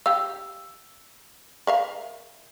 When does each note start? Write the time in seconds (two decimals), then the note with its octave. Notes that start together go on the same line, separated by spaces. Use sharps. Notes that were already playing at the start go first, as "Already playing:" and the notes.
0.06 G4 F5 E6
1.67 A#4 E5 F5